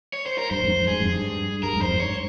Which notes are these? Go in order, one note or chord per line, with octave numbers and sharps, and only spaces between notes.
C#5
C5
A#4
G2 C5
F2 G#2
F2
G2 G#4
F2 G#2
G2
G2 A#4
F2 G#2
C5
F2 G#2
G2 C#5